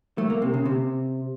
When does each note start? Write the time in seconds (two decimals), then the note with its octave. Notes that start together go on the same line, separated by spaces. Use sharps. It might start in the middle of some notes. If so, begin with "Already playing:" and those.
0.18 A3
0.30 A#3
0.42 C3
0.54 C#3
0.65 C3